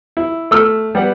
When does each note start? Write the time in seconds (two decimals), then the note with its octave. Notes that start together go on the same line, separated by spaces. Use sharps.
0.17 E4
0.51 A3 E6 F6
0.95 G3 B3 F#5